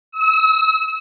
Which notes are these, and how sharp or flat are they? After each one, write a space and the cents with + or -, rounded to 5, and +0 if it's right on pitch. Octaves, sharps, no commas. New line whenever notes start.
E6 -40